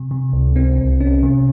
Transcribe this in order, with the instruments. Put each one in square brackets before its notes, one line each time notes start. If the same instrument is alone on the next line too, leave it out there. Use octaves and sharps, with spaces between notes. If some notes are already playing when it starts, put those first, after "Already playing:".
Already playing: [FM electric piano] C3
C3
C#2
C4
C2
C#4
C3